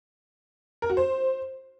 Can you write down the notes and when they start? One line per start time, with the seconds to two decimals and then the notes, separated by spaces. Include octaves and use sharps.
0.82 A#4
0.90 F#4
0.97 C5